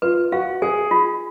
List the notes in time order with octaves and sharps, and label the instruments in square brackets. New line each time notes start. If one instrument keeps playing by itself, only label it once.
[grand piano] F4 [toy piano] B4
[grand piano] F#4 [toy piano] F5
[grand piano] G#4 [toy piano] G#5
[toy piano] F4